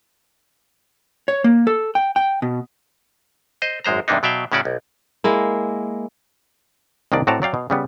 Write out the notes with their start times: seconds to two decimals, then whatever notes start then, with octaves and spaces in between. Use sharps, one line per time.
1.28 C#5
1.44 A#3
1.67 A4
1.95 G5
2.16 G5
2.42 B2
3.62 C5 D#5
3.84 G#1 F#2 G#3 C5 A#5
4.08 E2 G2 C3 A#3 D4 D#4
4.23 B2 F#3 D5 E5 F5 G5
4.52 A2 C#3 C#4 F#4 D5
4.65 B1
5.24 G#3 A#3 E4
7.12 C2 D#3 A#3 D4 D5
7.27 A2 C4 F#4 D5 A5 A#5
7.42 F#3 D5 F5 G5
7.54 B2
7.70 C#3 G3 B3